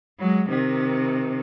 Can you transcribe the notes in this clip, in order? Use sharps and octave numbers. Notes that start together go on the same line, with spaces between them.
F#3 G#3
C3 D#3